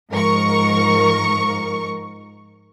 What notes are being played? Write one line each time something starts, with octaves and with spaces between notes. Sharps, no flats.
G#2 F3 A#4 C#6